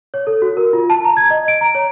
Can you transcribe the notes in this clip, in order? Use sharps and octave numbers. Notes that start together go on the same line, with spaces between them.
C#5
A4
F#4
A#4
F4
A5
A#5
G#6
D#5
D7
A#5
C#5